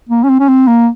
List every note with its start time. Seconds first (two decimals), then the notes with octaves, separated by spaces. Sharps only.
0.09 A#3
0.24 C#4
0.29 C4
0.40 C#4
0.49 C4
0.68 A#3